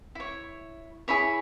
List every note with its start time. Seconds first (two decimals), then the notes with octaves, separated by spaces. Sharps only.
0.15 E4 C#5
1.08 E4 G#4 C#5 B5